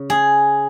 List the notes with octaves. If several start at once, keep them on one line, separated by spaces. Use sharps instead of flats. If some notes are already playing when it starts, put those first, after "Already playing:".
Already playing: C#3
G#4